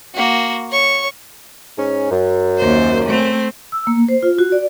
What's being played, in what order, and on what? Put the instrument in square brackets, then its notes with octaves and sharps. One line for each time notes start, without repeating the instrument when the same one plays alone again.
[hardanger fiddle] A#3 F#4
C#5 C#6
[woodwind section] G#2 C#4
F#2
[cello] D#2 C5
A3 C4
[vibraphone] E6
A#3
C5
F4
F#4
D5